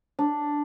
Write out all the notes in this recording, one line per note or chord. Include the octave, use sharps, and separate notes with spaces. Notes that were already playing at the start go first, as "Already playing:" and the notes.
D4